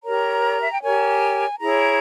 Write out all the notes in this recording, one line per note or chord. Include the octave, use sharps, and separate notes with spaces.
G4 A#4 C#5 A#5
E5
G5
G4 A#4 C#5 G#5
E4 G#4 C#5 A#5